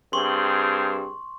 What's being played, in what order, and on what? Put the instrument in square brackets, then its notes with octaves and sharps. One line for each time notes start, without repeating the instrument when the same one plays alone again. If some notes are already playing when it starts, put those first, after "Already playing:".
[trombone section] G2 C4 G#4 [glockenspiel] C6 C#6